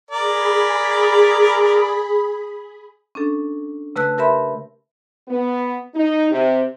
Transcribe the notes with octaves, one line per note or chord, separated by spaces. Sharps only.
G#4 A#4 D5 B5
C#4 D4 A4
C#3 A3 B4 A5 E6 F#6
G4 A#4 B4 E5 B5 C6
B3
D#4
C3